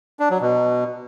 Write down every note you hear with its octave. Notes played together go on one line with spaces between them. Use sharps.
D4
F#3
B2